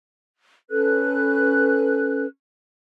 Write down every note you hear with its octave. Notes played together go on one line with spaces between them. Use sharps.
C#4 A4 B4 F#6